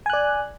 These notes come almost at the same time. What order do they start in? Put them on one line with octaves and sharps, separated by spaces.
G#5 F#6 D5